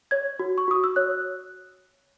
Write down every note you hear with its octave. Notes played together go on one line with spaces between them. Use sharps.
C#5 G#6
F#4
C#6
F#4 D#6
E6
C#5 F#6